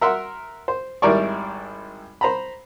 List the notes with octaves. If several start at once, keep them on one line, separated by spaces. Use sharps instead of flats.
A#4 E5 F#5 C6
C5
G#1 G3 E4 A#4 D5 C#6
C5 A#5 B5